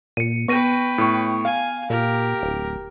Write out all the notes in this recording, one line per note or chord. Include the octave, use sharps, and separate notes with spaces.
A#2 C#7 D#7
B3 B4 G5 C#6 A#6 D#7
A2 C#6
F5 G#5
A#2 G4 A#4
D1